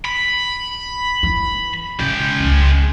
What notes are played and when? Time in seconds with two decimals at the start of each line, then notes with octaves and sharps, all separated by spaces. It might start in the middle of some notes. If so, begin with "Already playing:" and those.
0.05 B5
1.23 E3
2.00 C#3 G#3 G5
2.40 C#2 C#4